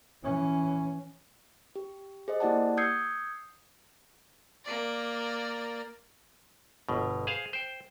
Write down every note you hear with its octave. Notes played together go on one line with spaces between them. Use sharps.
E3 C#4
G4
G#4 C5 D#5
A#3 E4 G4 D5 F#5 A5
D#6 E6 G6 G#6 C7 C#7
A#3 D5
G1 B2
G#4 C5 F5
C5 G5